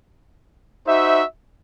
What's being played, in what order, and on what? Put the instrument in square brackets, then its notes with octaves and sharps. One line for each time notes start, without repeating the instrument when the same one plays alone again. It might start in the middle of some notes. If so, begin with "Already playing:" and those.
[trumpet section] D#4 F#4 C5 E5